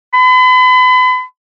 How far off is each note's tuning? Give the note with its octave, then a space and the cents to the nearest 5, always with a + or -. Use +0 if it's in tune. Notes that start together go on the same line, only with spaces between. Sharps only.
B5 +40